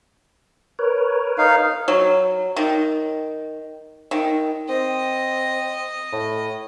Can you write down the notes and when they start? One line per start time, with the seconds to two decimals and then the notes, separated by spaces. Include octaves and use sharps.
0.79 A#4 B4 C#5
1.38 D#4 F5
1.88 F#3
2.56 D#3
4.11 D#3
4.69 C4 D#5
6.12 A2